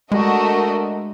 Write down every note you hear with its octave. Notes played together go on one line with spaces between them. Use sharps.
G#3 A3 D4 F#4 A#4 D#5